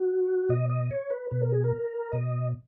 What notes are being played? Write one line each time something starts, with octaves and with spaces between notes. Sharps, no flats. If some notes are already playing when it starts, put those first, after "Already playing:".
Already playing: F#4
B2 D#5
D#5
C#5
B4
B2 B4
A#4
G#4
A#4
B2 D#5